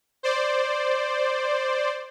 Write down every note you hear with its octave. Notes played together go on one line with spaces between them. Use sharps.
C5 D5